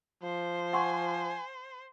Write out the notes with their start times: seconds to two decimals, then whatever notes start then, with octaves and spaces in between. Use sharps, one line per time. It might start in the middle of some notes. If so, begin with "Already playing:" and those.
0.23 F3 C5
0.73 F#5 G#5 C6 C#6